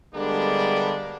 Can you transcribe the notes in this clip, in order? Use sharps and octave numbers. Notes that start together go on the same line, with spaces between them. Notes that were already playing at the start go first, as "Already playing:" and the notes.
D3 G3 G#3 A#3 B3 D4